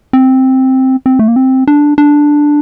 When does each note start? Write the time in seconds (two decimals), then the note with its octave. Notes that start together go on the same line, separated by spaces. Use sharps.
0.13 C4
1.06 C4
1.19 A3
1.28 A#3
1.36 C4
1.67 D4
1.98 D4